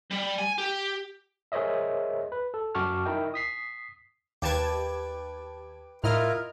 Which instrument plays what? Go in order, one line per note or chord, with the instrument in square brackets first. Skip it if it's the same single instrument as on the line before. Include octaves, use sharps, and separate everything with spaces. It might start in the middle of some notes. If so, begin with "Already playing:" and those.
[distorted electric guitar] G3
G#5
G4
[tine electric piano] G#4 A#4 C5 C#5 D#5 E5
B4
A4
F#2 F#4 A5 C#6 D6 F6
D#4 E4 A#4 D#5 G5
D#6 B6 C7
[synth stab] D#2 A5 G#6 [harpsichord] G4 B4
[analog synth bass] A2 [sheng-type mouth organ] E4 F4 A#4 [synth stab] D#5 F6